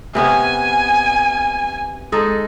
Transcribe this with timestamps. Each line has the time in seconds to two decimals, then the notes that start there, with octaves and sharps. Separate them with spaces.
0.15 C3 B3 C#4 G#5
2.12 G#3 D#4 A4